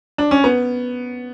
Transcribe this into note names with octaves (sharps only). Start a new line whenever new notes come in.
D4
C#4
B3